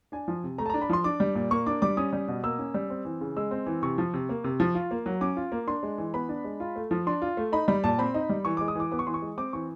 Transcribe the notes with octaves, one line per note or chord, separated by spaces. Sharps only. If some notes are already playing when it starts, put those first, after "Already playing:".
D4 G#5
F3
C3
A3 A#5
A5
D4 A#5
B5
F3 C6
D4 D6
G3
A#2
A#3 C#6
D4 D6
G3 D6
C#4 D#6
G3
B2
A#3 E6
C#4
G3
C4
E3
C#3
G#3 E6
C4
E3
C3 C#6
F3
C3
A#3
C3
F3
F4
A#3
F#3
C#4 D6
F4
A#3
D4 C6
G#3
E3
B3 B5
D4
G#3
F4
A3
F3
D4 C6
F4
A3
D#4 B5
G3 B5
A#2 A5
C4 B5
D#4
G3
E3 C#6
G#3 D6
D#6
E3 D6
B3 D6
C#6
E3 C6
C#6
G#3
C4 D6
E3 C#6